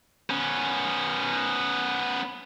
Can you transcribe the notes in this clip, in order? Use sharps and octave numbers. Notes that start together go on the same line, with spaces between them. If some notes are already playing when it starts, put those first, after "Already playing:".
B3 C#4